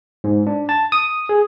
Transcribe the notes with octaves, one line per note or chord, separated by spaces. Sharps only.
G#2
D4
A5
D#6
G#4